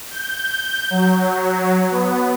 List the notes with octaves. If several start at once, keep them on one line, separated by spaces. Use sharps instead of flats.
G6
F#3
B3